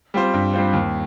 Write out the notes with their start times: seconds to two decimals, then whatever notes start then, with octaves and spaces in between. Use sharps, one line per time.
0.14 G3 C4 F4 C5
0.34 G2
0.54 G3 C4 F4 C5
0.73 D#2